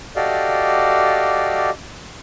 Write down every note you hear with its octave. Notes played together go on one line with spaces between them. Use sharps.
F#4 G4 A4 D5 D#5 F5